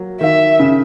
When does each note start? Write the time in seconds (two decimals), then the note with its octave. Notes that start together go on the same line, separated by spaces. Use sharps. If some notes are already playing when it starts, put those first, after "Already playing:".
Already playing: F#3 A#3
0.20 D#3 E5
0.59 C#3